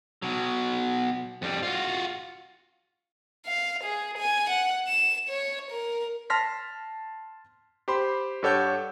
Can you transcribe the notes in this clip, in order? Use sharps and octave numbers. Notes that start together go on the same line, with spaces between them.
B2 F#3
F2 G3
F4 F#4
F5
G#4
G#5
F#5
E7
C#5
A#4
A5 C6 F6 A#6 B6
G4 C5 B5 C6
G2 G4 A4 C#5 F#5 G6